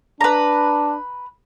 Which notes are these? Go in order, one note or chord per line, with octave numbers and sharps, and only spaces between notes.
D4 B4 A#5